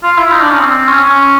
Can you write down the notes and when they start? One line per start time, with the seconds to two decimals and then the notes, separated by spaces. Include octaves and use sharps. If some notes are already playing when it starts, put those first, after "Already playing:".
0.03 F4
0.18 E4
0.31 D#4
0.41 D4
0.51 C#4
0.60 C4
0.89 C#4
1.03 C#4